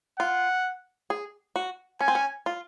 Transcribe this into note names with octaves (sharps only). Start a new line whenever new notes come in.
F4 F#5
G#4
F#4
C#4 G#5
C4
C#4
F4